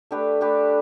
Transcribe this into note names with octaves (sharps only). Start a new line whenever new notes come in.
A3 D4 G4 B4
A3 D4 G4 B4